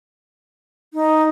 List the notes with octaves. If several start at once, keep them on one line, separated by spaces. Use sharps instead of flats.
D#4